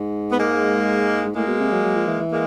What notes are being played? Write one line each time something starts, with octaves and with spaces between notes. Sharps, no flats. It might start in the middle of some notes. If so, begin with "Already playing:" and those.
Already playing: G#2
B3
G#3 A#3
G#2
A2 G#3 A#3
B2
C3
F#3
F#3
F3
E3
E3
G#3 A#3